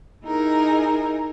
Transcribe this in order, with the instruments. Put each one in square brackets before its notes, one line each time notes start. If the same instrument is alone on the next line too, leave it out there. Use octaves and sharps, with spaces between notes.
[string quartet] D#4 E4 G#4 A#4